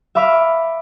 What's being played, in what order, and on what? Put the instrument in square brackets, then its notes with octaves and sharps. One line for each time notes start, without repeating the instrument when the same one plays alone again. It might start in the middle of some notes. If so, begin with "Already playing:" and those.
[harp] E5 F5 B5 D6 E6 F6